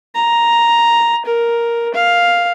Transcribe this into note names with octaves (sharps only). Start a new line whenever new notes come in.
A#5
A#4
F5